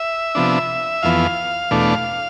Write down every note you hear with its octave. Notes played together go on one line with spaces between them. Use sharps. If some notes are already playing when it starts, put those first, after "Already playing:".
Already playing: E5
C3 F3 B3 D4
F2 E3 B3 F5
E2 B2 A3 D4